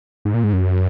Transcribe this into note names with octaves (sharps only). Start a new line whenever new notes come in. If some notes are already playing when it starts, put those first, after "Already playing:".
G#2
A#2
G#2
F#2